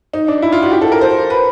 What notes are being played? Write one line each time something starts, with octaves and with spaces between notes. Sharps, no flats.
D#4
D4
E4
F4
F#4
G4
A4
A#4
C5
B4